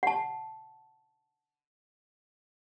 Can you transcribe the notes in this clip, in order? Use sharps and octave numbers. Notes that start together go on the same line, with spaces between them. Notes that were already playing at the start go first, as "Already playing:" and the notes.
F#5 A5